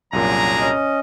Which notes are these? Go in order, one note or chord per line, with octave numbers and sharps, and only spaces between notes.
C2 F#2 A#2 F#3 D4 G#4 A#5
C#4 D#5